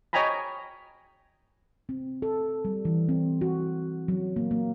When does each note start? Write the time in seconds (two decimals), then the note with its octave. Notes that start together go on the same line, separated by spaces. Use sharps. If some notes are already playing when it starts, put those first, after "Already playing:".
0.13 C#5 D#5 G5 G#5 A#5 B5
1.89 C4
2.22 A4
2.65 G3
2.85 E3
3.09 C4
3.41 F#4
4.08 F#3
4.36 A#3
4.51 A#3